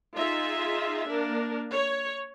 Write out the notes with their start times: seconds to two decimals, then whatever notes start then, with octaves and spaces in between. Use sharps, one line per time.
0.17 D#4 F4 G#4 E5
1.09 A#3 D4 A#4
1.73 C#5